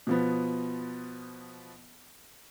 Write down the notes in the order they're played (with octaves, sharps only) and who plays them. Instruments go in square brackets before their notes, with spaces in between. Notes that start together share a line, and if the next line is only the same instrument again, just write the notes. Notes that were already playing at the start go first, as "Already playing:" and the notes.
[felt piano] B2 F3 B3